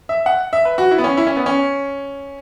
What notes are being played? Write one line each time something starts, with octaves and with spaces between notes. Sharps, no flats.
E5
F#5
E5
B4
F#4
E4
B3
C#4
E4
C#4
B3
C#4